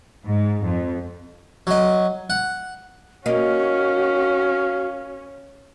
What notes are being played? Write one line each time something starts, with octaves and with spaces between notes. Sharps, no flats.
G#2
F2
F#3 D#5
F#5
A#3 C#4 D#4 F#4 F5